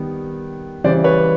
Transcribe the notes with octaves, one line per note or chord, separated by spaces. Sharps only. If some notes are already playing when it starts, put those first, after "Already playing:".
Already playing: D#3 G3 B3
C#3 E3 G3 C5 D5
B4 C#5